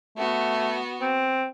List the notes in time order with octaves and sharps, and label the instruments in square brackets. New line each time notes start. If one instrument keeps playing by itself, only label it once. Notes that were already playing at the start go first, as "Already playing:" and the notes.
[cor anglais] A3 [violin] B3 F#4
[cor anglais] C4